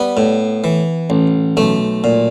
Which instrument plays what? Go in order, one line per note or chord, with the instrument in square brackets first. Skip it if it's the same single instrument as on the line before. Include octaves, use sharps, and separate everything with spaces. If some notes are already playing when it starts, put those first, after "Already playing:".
Already playing: [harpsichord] G3 B3
A2
E3
A1
B1 A3
A#2